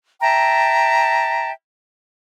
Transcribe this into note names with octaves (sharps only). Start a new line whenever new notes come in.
E5 G5 A5 A#5